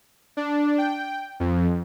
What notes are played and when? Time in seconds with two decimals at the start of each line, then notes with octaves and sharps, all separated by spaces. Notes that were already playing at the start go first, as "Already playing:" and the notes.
0.37 D4
0.78 G5
1.40 F2